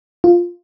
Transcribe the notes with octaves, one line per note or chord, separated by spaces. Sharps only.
F4